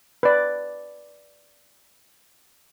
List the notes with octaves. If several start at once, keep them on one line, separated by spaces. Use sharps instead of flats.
B4 D5